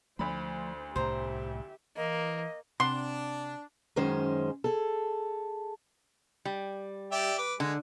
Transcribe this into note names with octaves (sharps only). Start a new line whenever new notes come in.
D2 F3 A3 C5 B5
C2 A2 G4 C5 E5 A#5
E3 A#3 D#5
C3 D4 F#5 C6
F#2 D#3 G#3 C#4 C5
G#4 A4
G3
G4 D5 E5
B4 D6
D3 G#3